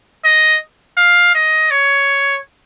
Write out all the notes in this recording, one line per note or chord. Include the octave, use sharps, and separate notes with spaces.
D#5
F5
D#5
C#5